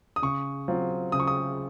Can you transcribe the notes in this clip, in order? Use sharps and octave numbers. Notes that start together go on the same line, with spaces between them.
D#6
C#3 C#6
F#3 C4 F4
C#3 D#6
C#6
D#6